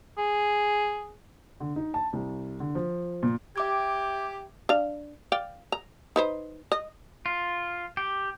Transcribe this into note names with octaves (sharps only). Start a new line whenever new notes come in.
G#4
D3
D#4
A5
C2
D3
F3
A#2
G4 E5 D6 G#6
D4 F5
D5 F5 G5
A#5
D#4 B4 C5
D#5
F4
G4